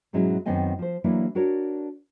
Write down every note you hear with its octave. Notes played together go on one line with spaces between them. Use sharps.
G#2 B2 F#3 G#3 C#4 E4
F#2 D#3 B3 C4 D#5 G#5
F3 C5
E3 F#3 A#3 D4 E4 B4
D4 F#4 A#4 C#5 D5